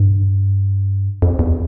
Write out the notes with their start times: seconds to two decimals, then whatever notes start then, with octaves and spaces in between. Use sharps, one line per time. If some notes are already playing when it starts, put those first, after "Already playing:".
Already playing: G2
1.22 F2
1.39 E2